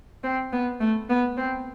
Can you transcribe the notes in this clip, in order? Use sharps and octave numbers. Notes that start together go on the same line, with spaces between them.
C4
B3
A3
B3
C4